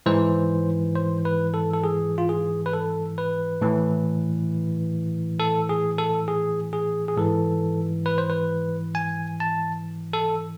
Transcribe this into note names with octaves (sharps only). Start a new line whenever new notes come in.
G#2 E3 C5
C5
B4
A4
A4
G#4
F4
G#4
B4
A4
B4
A2 E3
A4
G#4
A4
G#4
G#4
G#4
G#2 E3 A4
B4
C5
B4
G#5
A5
A4